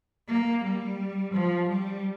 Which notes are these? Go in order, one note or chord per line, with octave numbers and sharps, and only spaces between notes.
A#3
G3
F3
G3